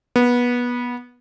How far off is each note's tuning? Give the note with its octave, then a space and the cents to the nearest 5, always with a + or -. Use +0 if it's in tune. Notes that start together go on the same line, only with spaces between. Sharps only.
B3 -20